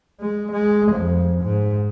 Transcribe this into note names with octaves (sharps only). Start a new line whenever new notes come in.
G#3
G#3
F2
G#2